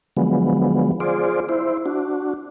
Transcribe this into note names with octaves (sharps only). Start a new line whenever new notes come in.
D3 F3 F#3 G#3 B3
F4 G#4 C5 D5
E4 C5
D4 F#4